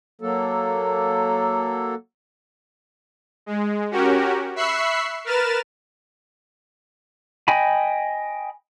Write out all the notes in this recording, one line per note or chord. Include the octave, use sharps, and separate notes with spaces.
F#3 A#3 A4
G#3
C#4 F#4 G4 A#4
E5 B5 C#6 E6 F#6 C7
A#4 B4 F6 A6 E7
D#5 G5 G#5 B5